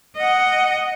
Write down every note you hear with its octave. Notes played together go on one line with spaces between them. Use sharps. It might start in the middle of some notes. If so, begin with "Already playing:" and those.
D#5 F#5